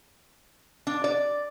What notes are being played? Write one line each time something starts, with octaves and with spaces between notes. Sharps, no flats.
D4
D5